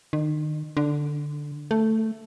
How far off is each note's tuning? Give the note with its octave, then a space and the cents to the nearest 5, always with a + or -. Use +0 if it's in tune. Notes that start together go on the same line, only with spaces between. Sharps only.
D#3 -35
D3 +5
A3 +5